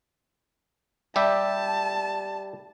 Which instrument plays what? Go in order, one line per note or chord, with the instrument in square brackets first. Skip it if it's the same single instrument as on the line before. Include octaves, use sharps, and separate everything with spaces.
[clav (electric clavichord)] G3 G4 E5 [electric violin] A5